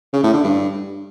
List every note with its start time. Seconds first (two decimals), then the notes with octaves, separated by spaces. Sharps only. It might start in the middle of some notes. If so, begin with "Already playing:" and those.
0.13 C#3
0.23 A2
0.34 D3
0.44 G2